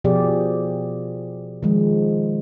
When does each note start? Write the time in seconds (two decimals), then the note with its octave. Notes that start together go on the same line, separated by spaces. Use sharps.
0.04 B2 F3 G4 G#4 D5
1.63 D#3 F3 G#3